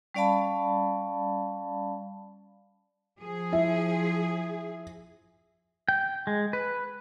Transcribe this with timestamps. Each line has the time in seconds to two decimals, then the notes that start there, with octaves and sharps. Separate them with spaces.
0.14 G3 C#4 D5 F5 A5 B5
3.19 F3 G#4
3.52 E4 E5
5.89 G5
6.27 G#3
6.53 B4